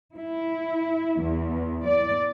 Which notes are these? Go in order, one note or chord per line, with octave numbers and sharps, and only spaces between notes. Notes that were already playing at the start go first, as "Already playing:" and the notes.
E4
E2
D5